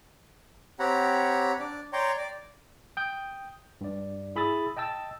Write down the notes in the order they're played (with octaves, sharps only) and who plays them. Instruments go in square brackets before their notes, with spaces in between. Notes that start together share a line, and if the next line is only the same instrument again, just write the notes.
[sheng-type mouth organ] C4 G4 C#5 F#5 A#5 B5
D4 D5
C#5 D5 G5 A#5 C6 C#6
D5
[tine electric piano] G5 D#6 G6
G2 D5
E4 G#4 B5 D#6 E6 A6
D#5 G5 A5 E6 A6